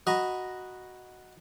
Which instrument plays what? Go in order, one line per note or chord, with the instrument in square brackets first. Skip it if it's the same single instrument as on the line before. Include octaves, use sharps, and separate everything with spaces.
[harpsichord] F#4 D#5 A#5 B5